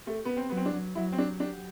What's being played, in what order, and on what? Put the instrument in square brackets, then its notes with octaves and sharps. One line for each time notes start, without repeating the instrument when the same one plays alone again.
[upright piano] A3 [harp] G4
[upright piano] B3 [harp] B4
[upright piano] C4
[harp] F#3 [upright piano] B3
[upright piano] C4
D4
[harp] F#3
[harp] F#3 [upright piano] E4
[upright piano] C4
[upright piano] D4 [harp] G4
[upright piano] D4 [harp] G4